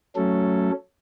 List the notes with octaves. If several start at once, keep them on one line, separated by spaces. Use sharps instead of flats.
F#3 A3 C#4 A4